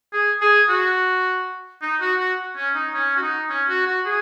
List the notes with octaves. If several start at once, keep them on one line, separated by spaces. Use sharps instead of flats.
G#4
G#4
F#4
D#4
F#4
F#4
C#4
D#4
C#4
F#4
D#4
C#4
F#4
F#4
G#4